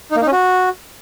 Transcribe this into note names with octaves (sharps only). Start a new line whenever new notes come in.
D#4
A#3
D#4
C#4
F#4